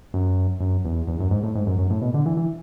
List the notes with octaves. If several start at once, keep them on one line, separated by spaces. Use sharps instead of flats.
F#2
F#2
E2
E2
F#2
G#2
A2
G#2
F#2
F#2
A2
B2
D3
E3
E3